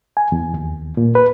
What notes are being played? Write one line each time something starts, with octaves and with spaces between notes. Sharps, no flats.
G#5
E2
D#2
A#2
B4